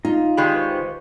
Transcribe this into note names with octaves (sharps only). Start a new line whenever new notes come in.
D#4 F4
D#3 G#3 G4 B5 C6 F#6
B4 C5 C#6